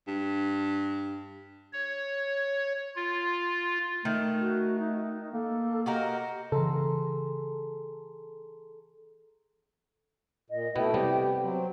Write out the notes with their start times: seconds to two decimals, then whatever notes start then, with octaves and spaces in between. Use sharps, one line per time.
0.07 G2
1.73 C#5
2.96 F4
4.05 D#3 A3
4.41 F#4
4.79 D#4
5.33 A#3 A4
5.86 F#4 G4 A#4 D#5
6.52 C#3 E3 G#4 A4 A#5 C6
10.50 A#2 D#5
10.76 B2 A3 B3 E4 G5
10.94 C3 G3 B3 G4
11.40 F#3 C4